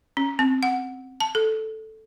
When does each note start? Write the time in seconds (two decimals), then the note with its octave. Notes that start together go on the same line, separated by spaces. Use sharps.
0.17 C#4
0.39 C4
0.63 F#5
1.20 A5
1.35 A4